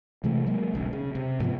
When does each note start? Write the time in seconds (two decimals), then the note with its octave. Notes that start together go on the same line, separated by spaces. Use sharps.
0.24 C3 E3 G#3 A3
0.47 F#3 G#3 A#3
0.73 D#1 B1 C#3
0.93 C#3
1.15 C3
1.40 G#2 C3 F3 B3